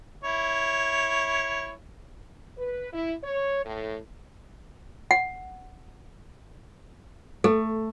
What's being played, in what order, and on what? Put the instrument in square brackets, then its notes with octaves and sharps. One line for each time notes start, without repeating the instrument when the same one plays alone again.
[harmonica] E4 C#5
[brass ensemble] B4
E4
C#5
A2
[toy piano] F#5
[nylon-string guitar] A3 [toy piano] A4